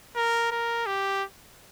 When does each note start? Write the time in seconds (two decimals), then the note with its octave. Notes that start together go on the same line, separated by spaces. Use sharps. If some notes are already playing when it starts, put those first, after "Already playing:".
0.16 A#4
0.51 A#4
0.86 G4